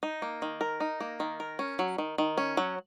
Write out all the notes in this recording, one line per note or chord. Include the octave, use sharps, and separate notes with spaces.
D#4
A#3
D#3
A#4
D#4
A#3
D#3
A#4
C#4
F#3
D#3
D#3
C#4
F#3